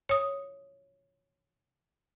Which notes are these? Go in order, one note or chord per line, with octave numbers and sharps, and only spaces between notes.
C#5 D#6